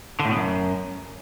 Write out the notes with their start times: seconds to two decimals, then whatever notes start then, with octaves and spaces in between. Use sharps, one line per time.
0.19 D3
0.25 A2
0.30 B2
0.36 F#2